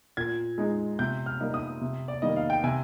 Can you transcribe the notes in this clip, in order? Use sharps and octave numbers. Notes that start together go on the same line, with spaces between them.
A#2 G#6
G#3 D#4
C3 G6
F6
G3 A#3 D#4
D#6
C3
D5
D#3 G3 A#3 D#5
F5
G5
C3 G#5